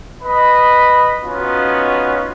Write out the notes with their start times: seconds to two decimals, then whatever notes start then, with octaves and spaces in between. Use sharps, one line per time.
0.23 B4 D#5 B5
1.23 B3 C#4 D#4 F4 F#4